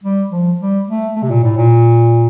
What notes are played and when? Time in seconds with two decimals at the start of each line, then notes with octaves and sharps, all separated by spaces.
0.04 G3
0.31 F3
0.60 G3
0.88 A3
1.16 A3
1.23 C3
1.30 A#2
1.43 A2
1.58 A#2